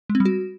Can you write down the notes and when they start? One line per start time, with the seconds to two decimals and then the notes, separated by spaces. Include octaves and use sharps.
0.10 G#3
0.15 C4
0.20 G3
0.25 F#4